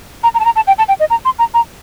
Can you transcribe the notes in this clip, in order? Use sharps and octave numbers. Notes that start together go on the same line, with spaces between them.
A#5
A#5
A5
A#5
A5
G5
A5
G5
D#5
A#5
C6
A#5
A#5